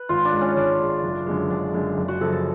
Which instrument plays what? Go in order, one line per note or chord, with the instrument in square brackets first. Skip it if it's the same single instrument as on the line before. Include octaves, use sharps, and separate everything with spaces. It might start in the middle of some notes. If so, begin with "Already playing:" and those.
Already playing: [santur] B4
[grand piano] G#1 [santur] F4
[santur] D4
[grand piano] G#2 G#3
[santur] C#4
[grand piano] G#1 [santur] D4
[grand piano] G#2 G#3
F#1
F#2 D3 G#3
[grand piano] F#1 [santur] D4
[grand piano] F#2 D3 G#3
F#1
[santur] F#4
[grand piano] F#2 C#3 F3 [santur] A4
[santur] A4